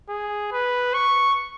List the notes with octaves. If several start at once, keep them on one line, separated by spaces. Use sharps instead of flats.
G#4
B4
C#6